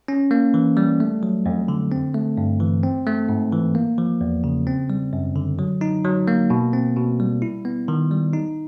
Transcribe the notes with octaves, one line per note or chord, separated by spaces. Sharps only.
C#4
A#3
E3
G3
A3
F#3
F2
D3
C4
A3
G2
E3
C4
A3
G#2
E3
A#3
F3
E2
C#3
C4
G3
F#2
D3
F#3
D#4
F#3
A#3
B2
C4
B2
G3
E4
B3
D#3
G3
D#4